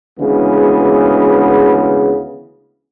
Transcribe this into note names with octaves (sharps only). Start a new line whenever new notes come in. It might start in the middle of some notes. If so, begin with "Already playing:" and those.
D2 C#3 E3 G#3 B3